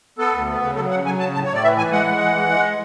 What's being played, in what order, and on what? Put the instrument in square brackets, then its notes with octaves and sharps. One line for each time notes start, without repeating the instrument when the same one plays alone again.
[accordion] B3 A4
D2
B3
C#3
F#3 A4
C#3 F#5
F#3 G#5
C#3 A5
A2 A5
C#5
A2
D5
E3 E5
E3 G#5
G#3 F#5
G#3
E3
G#3
G#3